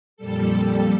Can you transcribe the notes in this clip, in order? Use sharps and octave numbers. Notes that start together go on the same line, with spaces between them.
F2 A#2 G3 A4